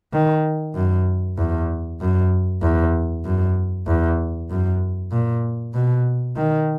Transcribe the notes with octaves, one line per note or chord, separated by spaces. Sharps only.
D#3
F#2
E2
F#2
E2
F#2
E2
F#2
A#2
B2
D#3